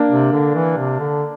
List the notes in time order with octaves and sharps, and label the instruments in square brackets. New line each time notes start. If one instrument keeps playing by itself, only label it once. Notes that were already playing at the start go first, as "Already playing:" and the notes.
Already playing: [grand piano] A#3 D4
[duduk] C3
D3
E3
C3
D3